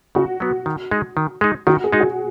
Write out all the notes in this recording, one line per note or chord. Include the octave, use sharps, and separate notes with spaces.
C#3 F#4
F#3 B3
D#3
G#3 D#4
D#3
G#3 D#4
D#3 F#4
G#4
G#3 D#4
F#4